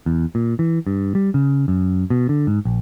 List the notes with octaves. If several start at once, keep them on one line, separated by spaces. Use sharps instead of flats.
E2
A#2
E3
G2
G3
C#3
F#2
B2
D3
G#2
A#1